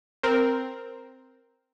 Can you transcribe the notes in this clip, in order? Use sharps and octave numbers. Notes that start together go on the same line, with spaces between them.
C4 A#4